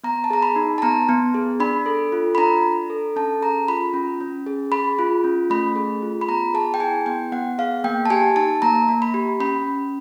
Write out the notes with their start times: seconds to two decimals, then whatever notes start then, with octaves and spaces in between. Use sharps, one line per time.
0.04 B3 A#5
0.24 A5
0.30 G#4 A#5
0.43 B5
0.56 D#4
0.78 A5
0.82 B3 A#5
1.09 B3
1.34 G#4
1.60 D4 B5
1.86 A4
2.12 F4
2.35 B5
2.38 D4 A#5
2.64 D4
2.90 A4
3.16 C#4 A5
3.42 G#4 A#5
3.68 F4 B5
3.94 C#4
4.21 C#4
4.47 G#4
4.72 G#4 B5
4.99 F4
5.24 C#4
5.50 A3 B5
5.76 G#4
6.02 F4
6.21 B5
6.28 B3 A#5
6.54 G#4 A5
6.74 G5
6.80 E4 G#5
7.06 B3 G5
7.32 B3 F#5
7.58 G#4 F5
7.84 A#3 G5
8.06 A5
8.10 G4 G#5
8.36 D#4 A5
8.62 A#3 A#5
8.88 A#3
9.02 B5
9.14 G4
9.40 C#4 B5